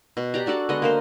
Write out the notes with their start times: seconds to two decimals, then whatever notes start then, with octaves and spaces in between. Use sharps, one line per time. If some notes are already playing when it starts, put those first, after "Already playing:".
0.17 B2
0.34 G4 D5 A#5
0.46 D4 F#4 A4 D5
0.69 D3 G#3 B3 D#5
0.82 A#3 A#4 C5